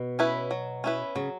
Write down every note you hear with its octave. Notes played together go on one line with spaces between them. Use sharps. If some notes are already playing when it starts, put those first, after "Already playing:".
Already playing: B2
C#4 E4 B4
F#3
C#4 E4 B4
C#3 F#3